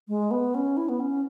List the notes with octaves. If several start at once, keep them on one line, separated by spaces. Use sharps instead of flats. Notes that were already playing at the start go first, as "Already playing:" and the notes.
G#3
B3
C#4
E4
B3
C#4